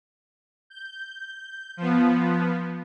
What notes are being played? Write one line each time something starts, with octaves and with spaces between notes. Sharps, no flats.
G6
F3 B3